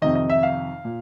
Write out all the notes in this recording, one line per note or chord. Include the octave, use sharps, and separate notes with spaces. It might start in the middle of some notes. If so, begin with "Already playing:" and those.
F2 C3 D#3 D#5
D#5
E5
F5
A#2